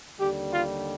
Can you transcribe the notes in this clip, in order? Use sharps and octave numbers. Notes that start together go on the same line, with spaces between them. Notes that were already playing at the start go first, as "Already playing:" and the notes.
D#2 D3 G3 G4
F4